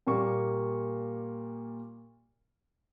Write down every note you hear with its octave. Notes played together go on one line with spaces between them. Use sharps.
A#2 G3 A#3 C#6